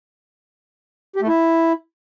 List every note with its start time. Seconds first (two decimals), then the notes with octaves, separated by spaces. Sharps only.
1.16 G4
1.22 A3
1.28 E4